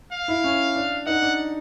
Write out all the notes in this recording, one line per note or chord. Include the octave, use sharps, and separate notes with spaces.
F5
E4
C#4
D4
D#4 F#5
D4